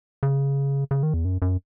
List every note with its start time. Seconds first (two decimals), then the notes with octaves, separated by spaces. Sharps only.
0.23 C#3
0.91 C#3
1.03 D#3
1.14 E2
1.25 F#2
1.42 F#2